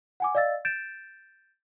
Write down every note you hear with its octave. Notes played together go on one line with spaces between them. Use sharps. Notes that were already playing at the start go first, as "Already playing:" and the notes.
F#5 G#5 D6
D5 D#5 F5 E6 A6
G6 A6 D7 E7